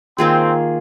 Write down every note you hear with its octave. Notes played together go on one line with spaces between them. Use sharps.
D#3 A#3 C4 F4 G#4